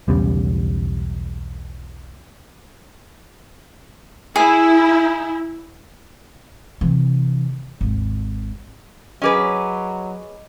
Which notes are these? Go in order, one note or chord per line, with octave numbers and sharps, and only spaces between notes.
B1 E2 C#3 G3
E4 G#4
C3 E3
G#1 D#2
F#3 C#4 G#4 B4 D#5 D6